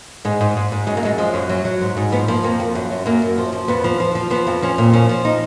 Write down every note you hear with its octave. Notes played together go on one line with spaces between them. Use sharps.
G#2 G#3
G#2
G#2
G#2
F#2 G#3
A#3
F#2 G#3
F3 G#3
F#2
F#3
F#3
G#2
G#2
F3 B3
F3 A#3
F2 A#3
F2
F#2
F#2
F#2 A#3
F#2
F3
F3
F2 B3
F3
F3
F3
F3 B3
F2
F3 C#4
A#2
F3 C#4
F3
D#4